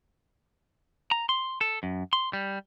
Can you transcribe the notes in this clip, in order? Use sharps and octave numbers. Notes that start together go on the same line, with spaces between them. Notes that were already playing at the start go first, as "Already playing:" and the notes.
A#5
C6
A4
F#2
C6
G3